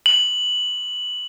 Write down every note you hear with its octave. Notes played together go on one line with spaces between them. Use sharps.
F#7